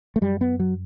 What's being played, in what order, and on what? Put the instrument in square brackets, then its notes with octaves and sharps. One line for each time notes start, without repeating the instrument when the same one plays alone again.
[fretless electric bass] A3
F#2 G3
B3
F#3